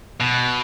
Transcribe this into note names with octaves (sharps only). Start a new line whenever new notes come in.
B2